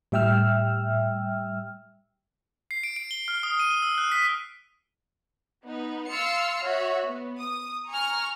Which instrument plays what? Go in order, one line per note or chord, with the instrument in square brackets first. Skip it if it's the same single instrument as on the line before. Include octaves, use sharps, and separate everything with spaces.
[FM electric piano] A2 G3 E5 G5 E6 F6
[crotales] C7
D7
D7
G7
F6
D#6
D#7
E6
F#6
B6
[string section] B3 D#4
F5 C6 E6 F6 A6 C#7
F#4 C#5 E5
B3
D#6
G#5 A#5 C#6 F6